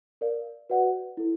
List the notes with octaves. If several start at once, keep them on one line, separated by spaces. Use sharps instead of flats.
A#4 D5 F5
F#4 B4 D5 F#5
E4 A4